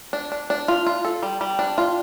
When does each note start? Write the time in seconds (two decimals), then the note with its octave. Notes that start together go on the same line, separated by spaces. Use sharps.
0.13 D4
0.32 D4
0.50 D4
0.68 F4
0.86 F4
1.05 A4
1.23 G3
1.41 G3
1.59 D4
1.78 F4